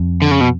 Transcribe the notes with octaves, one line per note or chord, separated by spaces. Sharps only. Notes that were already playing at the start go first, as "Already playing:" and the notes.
Already playing: F2
D3
C#3
B2